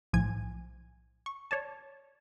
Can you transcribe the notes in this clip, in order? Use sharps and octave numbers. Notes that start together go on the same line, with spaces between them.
B1 A2 F3 G#5 G#6
C#6
C#5 D5 A5